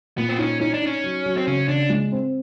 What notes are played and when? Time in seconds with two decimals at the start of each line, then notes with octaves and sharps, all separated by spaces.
0.17 A#2 B3
0.29 C4
0.39 C#4 D#4
0.61 C#4 D#4
0.74 D4
0.83 C#4 D#4
1.04 F#3
1.26 F#3
1.37 C4
1.47 C#3 C#4
1.68 C#3 D4
1.90 G#3
2.12 C4